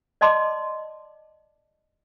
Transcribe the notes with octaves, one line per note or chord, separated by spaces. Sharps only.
D5 D#5 A5 C6 D6